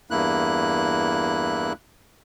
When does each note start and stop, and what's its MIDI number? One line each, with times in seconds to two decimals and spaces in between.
0.10 1.73 40
0.10 1.73 43
0.10 1.73 58
0.10 1.73 64
0.10 1.73 90